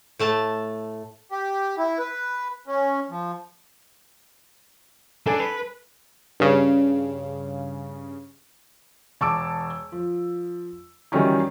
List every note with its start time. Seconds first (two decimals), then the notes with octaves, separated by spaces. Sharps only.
0.19 A2 A3 A5
1.32 G4
1.78 E4
1.99 B4
2.67 C#4
3.10 F3
5.26 D4 A4 G#5
5.40 B4
6.40 G2 C#3
9.21 E1 A5 C#6 D6 E6 D7
9.92 F3
11.12 D#3 E3 F#3 G3 C#4 D#4